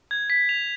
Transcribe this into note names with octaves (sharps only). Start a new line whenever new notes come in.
G#6
B6
F7